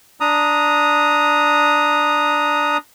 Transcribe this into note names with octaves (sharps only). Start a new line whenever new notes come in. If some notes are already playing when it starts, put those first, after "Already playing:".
D4 A#5 D#6